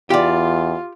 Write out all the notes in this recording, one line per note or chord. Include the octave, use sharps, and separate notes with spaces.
E2 F4 G4 D5